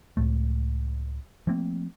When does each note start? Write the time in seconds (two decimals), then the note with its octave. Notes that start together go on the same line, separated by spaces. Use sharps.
0.17 C#2 F#2 A2 A3
1.47 F3 A3 A#3 C4